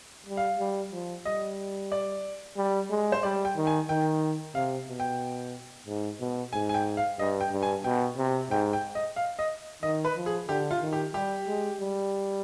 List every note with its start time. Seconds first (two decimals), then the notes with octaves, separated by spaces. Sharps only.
0.26 G3
0.37 F5
0.59 G3
0.92 F3
1.25 G3 D#5
1.92 D5
2.57 G3
2.90 G#3
3.12 C5
3.23 G3 D5
3.45 G5
3.57 D#3
3.67 G#5
3.89 D#3 G5
4.55 C3 F5
4.88 B2
5.00 G5
5.87 G#2
6.20 B2
6.53 G#2 G#5
6.69 G#5
6.74 G5
6.97 F5
7.19 G2 D#5
7.41 G5
7.52 G2
7.63 G#5
7.84 B2 G5
8.18 C3
8.50 G#2 G5
8.73 G5
8.95 D#5
9.16 F5
9.39 D#5
9.83 D#3 D#5
10.05 B4
10.16 F3
10.26 G#4
10.48 D3 G4
10.71 F4
10.82 D#3
10.93 G4
11.14 G3 G4
11.47 G#3
11.81 G3